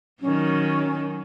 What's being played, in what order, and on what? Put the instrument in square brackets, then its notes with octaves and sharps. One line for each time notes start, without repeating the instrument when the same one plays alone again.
[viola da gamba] D#3 F#3 [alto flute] C#4